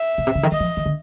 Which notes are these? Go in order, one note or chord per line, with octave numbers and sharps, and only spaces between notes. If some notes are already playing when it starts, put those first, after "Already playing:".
Already playing: E5
B2
C3
C#3
D#3
E3 D#5
F3
D#3
D3